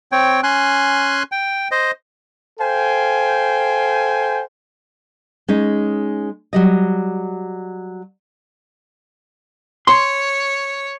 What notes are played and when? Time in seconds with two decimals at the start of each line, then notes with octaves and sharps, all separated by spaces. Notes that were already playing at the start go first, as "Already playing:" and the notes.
0.12 C4 C#5 G5
0.43 C#4 G#5 C6 F#6
1.32 G5
1.71 C5 D#5
2.59 A4 C5 F5 G5 G#5
5.48 G#3 C#4 D#4
6.53 F#3 G3 D#5
9.87 C#5 C6